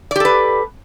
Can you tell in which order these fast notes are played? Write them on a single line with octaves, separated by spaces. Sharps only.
D5 G4 A4 B4